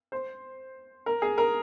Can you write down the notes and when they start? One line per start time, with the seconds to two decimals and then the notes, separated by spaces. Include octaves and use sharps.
0.12 C5
1.06 A#4
1.22 G#4
1.38 A#4